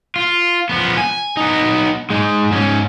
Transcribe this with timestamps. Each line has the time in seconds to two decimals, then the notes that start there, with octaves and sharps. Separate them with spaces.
0.16 F4
0.69 F3 B3
0.98 G#5
1.37 B3 D#4
2.10 G#3 D#4
2.51 G#2 C#4